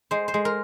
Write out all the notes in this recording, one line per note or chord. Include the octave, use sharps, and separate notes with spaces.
G#3 C5
C5
G#3
A#4